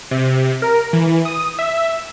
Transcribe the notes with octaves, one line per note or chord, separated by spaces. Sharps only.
C3
A#4
E3
D#6
E5